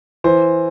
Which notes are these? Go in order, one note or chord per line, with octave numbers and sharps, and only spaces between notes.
E3 C5